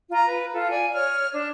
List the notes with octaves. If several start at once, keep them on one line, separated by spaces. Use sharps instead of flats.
F4 A#5
B4
F4 A4
D5 G#5
C#5 F6
D4